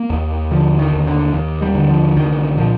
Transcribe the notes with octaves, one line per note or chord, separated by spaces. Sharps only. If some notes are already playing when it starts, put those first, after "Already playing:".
Already playing: A#3
D#2
D3 F3
D#3
D#2
D3
D#2 D#3
G3
D3
F3
C2 D#3
A#2 F3